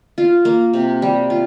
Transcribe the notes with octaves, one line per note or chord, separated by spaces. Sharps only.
F4
A#3
C3
G3
F4